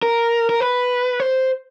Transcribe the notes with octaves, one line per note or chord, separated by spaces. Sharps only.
A#4
A#4
B4
C5